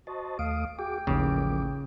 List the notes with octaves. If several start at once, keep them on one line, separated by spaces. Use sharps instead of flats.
F#4 C5 D#5 A5
D#2 A3 F5 D#6 D7
F#4 G#4 G5 D6
A1 D#2 C#3 F3 A#3 D6